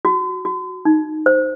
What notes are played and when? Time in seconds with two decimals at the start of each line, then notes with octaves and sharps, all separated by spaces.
0.05 F#4
0.45 F#4
0.85 D#4
1.26 C5